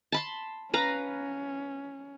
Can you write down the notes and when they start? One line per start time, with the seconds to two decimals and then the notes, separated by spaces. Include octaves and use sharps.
0.12 A5 B5 C6
0.74 C#4 B4 F5 A#5